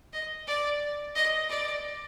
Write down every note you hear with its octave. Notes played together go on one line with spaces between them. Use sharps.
D#5
D5
D#5
D5